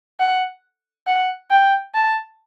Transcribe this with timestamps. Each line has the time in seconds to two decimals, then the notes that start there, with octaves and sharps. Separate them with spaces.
0.20 F#5
1.07 F#5
1.51 G5
1.95 A5